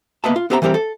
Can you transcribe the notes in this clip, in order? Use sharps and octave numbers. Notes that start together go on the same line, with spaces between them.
A#3 B3 B4 D#5 E5 A5
F4
B3 C4 G4 E5 A5 A#5
E3 G3 C4 G4 A#4
A4